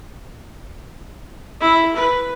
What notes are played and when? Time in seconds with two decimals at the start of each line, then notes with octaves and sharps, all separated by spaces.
1.61 E4
1.96 B4